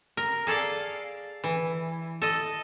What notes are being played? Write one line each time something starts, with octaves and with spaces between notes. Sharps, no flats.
A#4
G#4 A4 D5 F5
E3
A4 D#5